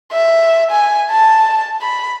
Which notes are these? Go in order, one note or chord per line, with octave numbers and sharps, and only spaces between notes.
E5
G#5
A5
B5